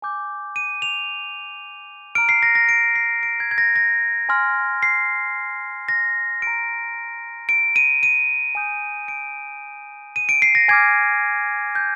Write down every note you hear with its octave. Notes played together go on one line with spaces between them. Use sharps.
G#5 D6 G6
D#7
F7
A#5 F6 D7
C7
A#6
A#6
D7
C7
D7
G#6
G#6
A#6
A#6
G#5 C6 F6
C7
A#6
A#5 F6 D7
D7
D#7
D#7
G#5 D#6 G6
D7
D#7
D7
C7
A#6
G#5 D6 F6 G#6
G6